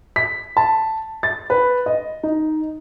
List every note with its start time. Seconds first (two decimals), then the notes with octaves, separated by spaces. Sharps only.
0.16 B6
0.57 A5
1.23 A6
1.50 B4
1.86 D#5
2.23 D#4